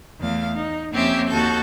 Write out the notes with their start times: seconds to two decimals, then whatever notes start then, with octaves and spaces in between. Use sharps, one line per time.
0.19 E2 A3 F5
0.54 D#4
0.92 F2 A#3 C4 C#4 G4 E5
1.28 D#2 F#4 A4 G6